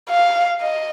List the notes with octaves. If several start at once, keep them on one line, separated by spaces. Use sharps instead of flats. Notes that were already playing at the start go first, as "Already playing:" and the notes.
F5
D#5